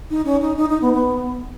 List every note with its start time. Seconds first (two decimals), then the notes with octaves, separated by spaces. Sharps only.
0.10 D#4
0.25 C#4
0.41 D#4
0.57 D#4
0.69 D#4
0.81 B3
0.93 B3